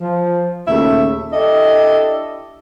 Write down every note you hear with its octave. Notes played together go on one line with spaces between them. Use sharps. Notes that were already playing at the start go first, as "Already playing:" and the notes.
F3
D#2 A#2 C#3 A3 E5
D4 E4 G4 A4 D#5